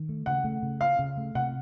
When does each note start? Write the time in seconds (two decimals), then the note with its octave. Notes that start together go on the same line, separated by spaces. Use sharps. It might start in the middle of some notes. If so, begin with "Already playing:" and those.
Already playing: D#3
0.09 A3
0.26 C#3 F#5
0.44 A3
0.63 C#3
0.81 C#4 F5
0.99 C#3
1.17 A3
1.35 C3 F#5